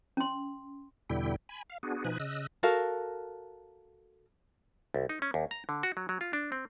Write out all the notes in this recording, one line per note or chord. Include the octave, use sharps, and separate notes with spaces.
C#4 C6
E2 B2 D3 G3 E4 G5
G#5 B5
F5
B3 D4 F#4 G#4
B2 F3 D#4 B4 G#5 F#6
C#3 D#5 E6 F#6
F#4 A4 A#4 F5
C2
D#4
C#4
D#2
A#5
D3
F#4
F#3
F#3
F4
D4
C4